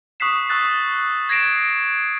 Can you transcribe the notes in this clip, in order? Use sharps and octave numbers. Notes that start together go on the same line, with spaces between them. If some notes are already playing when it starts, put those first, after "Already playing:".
C#6 D#6 F#6 B6 C7 E7
C#6 E6 F#6 A6
G#6 A#6 C7 D7 E7